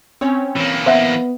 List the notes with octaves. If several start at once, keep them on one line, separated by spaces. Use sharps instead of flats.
C4 C#4 C#5
E3 A#3
B3 C5 E5 F#5